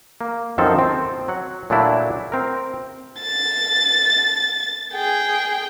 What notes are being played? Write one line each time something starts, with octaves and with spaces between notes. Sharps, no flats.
A#3
F#2 D#3 F3 C4 A4 C5
C4
F#3 F#5
A#2 F#3 A3 D4 E4
C4 A#4
A6
G#4 G5